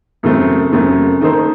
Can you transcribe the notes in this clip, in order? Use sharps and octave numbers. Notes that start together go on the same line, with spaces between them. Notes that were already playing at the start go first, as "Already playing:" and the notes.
F#2 C#3 A3 C4
F#2 C#3 A3 C4
D#3 A#3 D#4 A4 C5